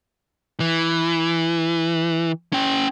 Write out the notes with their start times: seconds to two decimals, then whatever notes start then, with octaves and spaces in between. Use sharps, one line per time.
0.60 E3
2.53 C#4 G5